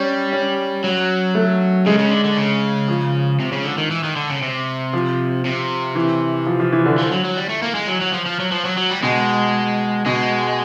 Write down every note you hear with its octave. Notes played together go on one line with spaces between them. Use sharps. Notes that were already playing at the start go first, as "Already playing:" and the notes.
Already playing: G3 C#4
C#4
F#3
A3
C#3 G#3
C#3
D3
D3
C#3
F3
C3
C#3
D3
D#3
E3
D#3
D3
C#3
C3
F3
C3
E3
F3
F3
E3
D3
F3
F#3
F#3
G3
A3
A#3
G#3
F#3
F#3
F3
F3
F#3
F3
F#3
F#3
G3
B2 G#3
B2 G#3